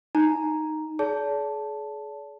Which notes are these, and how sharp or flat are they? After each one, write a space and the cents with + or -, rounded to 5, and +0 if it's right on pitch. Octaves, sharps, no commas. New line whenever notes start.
D#4 +0 A#5 +0
G#4 +35 D5 -45 A5 +0